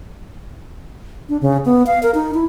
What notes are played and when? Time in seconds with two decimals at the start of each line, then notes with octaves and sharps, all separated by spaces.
1.29 D4
1.41 C#3
1.65 B3
1.86 F5
2.03 A#4
2.14 D#4
2.34 E4